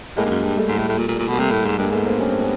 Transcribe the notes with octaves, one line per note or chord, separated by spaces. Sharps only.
A2 G#3 A#3
G2
F#2
G2
G3 A3
G#2
A2
A2
A#2
A#2
A#2
B2 A#3
C3 G3 A3
A2
G#2
G2 G#3 A#3
G#2 A3 B3
A#3 C4
G2 C#4
C4
B3 C#4